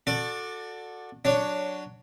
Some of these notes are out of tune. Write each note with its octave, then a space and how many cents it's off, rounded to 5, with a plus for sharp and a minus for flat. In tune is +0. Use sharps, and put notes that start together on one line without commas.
F#4 -15 A4 +5 D5 +15
F#3 +0 D4 +0 C#5 +10